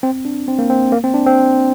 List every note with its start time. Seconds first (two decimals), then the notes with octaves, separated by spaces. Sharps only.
0.03 C4
0.25 D4
0.48 C4
0.59 A#3
0.70 C4
0.92 A#3
1.04 C4
1.14 D4
1.26 C4